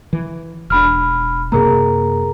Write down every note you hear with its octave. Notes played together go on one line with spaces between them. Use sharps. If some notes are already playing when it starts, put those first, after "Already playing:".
E3
E1 D4 B5 F6
F#2 C3 A#3 G#4 A#4 A#5